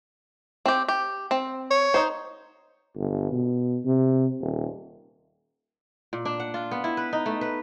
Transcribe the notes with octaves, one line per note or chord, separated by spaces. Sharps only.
C4 G4
G4
C4
C#5
D#4 C5
G1
B2
C3
D#1
A#2
D4
F#5
F4
B3
E4
B4
D#4
A3
B4